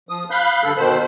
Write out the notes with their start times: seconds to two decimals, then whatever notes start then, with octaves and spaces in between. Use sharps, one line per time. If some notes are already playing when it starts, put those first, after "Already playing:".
0.09 F3 D#6
0.30 F5 B5 F#6 G6
0.63 G2 D3 A4
0.77 B2 D#3 C5